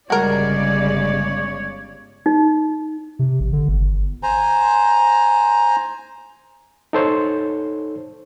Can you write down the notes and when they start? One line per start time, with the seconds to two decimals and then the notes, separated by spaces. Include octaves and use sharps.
0.10 G1 C#3 G3 G#3 F#4 A#4 C#5 D5
2.26 D#4
3.19 C3
3.40 A1
3.53 D3
3.68 G1
4.23 C5 G#5 A#5
6.93 D#4 A4 C5 C#5